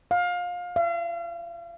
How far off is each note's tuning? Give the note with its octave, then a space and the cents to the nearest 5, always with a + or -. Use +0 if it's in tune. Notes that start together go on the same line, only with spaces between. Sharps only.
F5 +25
F5 -40